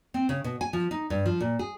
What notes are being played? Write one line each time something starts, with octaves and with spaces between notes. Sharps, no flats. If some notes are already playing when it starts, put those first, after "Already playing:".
C4
C#3
B2
G#5
F3
D#4
G2
F3
A#2
G#4